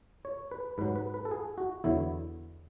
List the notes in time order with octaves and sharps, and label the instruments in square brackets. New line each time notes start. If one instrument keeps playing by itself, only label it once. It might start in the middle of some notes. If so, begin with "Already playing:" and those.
[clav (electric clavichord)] C#5
B4
G#2 B4
F#3
B4
B4
A4
G#4
F#4
E2 D3 F#3 E4